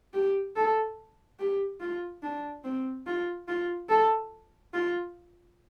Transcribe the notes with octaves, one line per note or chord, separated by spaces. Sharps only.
G4
A4
G4
F4
D4
C4
F4
F4
A4
F4